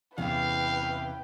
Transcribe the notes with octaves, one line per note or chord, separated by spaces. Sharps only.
E2 C3 C#4 E4 B4 F5 G5